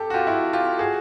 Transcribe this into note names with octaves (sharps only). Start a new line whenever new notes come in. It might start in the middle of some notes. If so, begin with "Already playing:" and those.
Already playing: G4 A4
F#4
F4 G4
E4 F#4
F4 G4
F#4 G#4